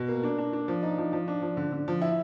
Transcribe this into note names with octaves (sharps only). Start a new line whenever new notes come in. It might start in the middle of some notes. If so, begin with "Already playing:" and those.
Already playing: B2
A#3
D4
D4
D4
F3
D#4
F3
F3
D4
F3
D3
D3
F3
E4